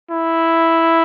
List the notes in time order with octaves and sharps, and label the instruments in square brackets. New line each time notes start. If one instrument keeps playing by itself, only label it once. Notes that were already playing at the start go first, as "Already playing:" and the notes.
[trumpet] E4